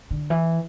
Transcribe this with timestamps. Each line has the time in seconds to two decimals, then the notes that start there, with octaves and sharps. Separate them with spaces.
0.11 D3
0.30 E3